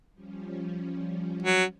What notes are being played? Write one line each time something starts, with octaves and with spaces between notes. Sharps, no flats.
F3 G3 C#4
F#3